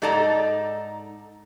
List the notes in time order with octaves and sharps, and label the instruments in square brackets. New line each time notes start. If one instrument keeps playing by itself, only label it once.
[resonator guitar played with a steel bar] G#2 D#4 A4 D5 A5 A#5